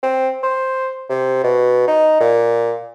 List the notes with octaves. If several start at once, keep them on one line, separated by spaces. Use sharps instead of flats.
C4
C5
C3
B2
D#4
A#2